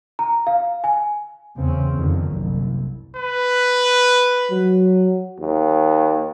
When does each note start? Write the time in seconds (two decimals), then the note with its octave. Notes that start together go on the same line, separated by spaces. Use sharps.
0.19 A#5
0.47 F5
0.84 G#5
1.57 E2 C#3 C4 C#4
1.96 F2 D3 D#3
2.27 F#1 C2
3.16 B4
4.51 F#3
5.40 D#2